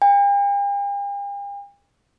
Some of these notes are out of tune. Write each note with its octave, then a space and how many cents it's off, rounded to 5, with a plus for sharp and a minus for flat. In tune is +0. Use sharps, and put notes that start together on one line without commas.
G5 +45